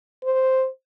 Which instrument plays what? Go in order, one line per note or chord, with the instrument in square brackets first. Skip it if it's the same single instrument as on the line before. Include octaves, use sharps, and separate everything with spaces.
[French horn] C5